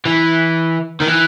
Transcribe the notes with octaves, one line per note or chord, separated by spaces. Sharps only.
E3
D#3
E3